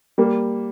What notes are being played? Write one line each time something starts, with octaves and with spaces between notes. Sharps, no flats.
G3 A#3